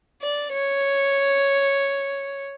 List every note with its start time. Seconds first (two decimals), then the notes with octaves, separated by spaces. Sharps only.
0.23 D5
0.52 C#5